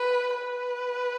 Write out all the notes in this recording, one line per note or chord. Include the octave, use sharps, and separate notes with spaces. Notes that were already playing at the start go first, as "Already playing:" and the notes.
Already playing: B4
B4